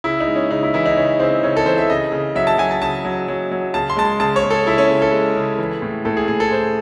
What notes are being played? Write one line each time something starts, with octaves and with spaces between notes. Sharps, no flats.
C#3 E4
D#4
G#3
C#4
C#3 D#4
E4
E3 E4
D#4
C#3 C#4
C#3 C4
C#3 C#4
A4
E3 C5
E5
C#3 D#5
C#3
F#3 E5
A5
F#3 G#5
A5
C#3 A5
F#3
F#3
F#3
C#3 A5
C6
G#3 A5
C6
C#3 A5
C#5
C#3
A4
C#3 E4
C#4
C#3
A4
G#3
C#3
E3
A2
A2 A4
G#4
A2 G#4
A4
A2 C5